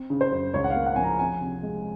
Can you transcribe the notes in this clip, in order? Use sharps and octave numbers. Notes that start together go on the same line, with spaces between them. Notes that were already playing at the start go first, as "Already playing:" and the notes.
Already playing: C4
C#3
C5
F#2
C#2 C#5
F#5
F5
A#3
F#5
F3 G#5
A#5
C4 G#5
C3
G#3